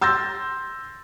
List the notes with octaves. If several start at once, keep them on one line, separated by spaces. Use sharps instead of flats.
C6 E6 G6 A6 A#6